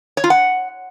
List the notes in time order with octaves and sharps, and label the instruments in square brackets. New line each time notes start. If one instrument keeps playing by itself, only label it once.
[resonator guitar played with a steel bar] C#5
F4
F#5